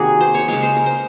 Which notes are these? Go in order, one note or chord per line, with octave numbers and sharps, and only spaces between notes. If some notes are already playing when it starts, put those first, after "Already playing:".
Already playing: C3 D#3 A#3 F#4 G#4
C5
C#5
C#3 G#3 C#5
C5
A#4
C5